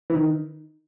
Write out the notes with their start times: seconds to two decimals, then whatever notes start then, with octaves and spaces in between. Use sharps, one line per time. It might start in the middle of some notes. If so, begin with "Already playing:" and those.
0.10 E3
0.15 D#3